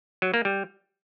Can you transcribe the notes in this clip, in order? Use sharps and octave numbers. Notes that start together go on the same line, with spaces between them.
F#3
A#3
G3